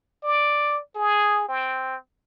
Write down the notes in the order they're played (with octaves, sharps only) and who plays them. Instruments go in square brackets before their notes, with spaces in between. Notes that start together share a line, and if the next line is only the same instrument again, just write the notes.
[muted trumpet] D5
G#4
C4